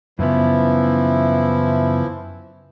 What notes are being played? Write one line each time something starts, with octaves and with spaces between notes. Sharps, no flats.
F#2 C#3 E3 F3 B3 E4